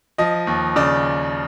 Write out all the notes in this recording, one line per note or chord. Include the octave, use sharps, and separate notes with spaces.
F3 D#5
D#2
C#3 D5